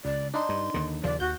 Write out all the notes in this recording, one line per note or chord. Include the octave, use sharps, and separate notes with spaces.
C#2 D5
D4 D#4 C6
G2
D#2 D3
D#2 C#3 F3 D5
D#2 F#4 G6